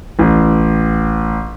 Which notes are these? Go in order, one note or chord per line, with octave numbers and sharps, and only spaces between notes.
A1